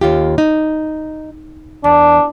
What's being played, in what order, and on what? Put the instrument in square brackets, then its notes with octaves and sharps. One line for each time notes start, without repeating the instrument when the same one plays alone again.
[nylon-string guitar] D#2 F4 G4
D#4
[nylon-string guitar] E2 [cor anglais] D4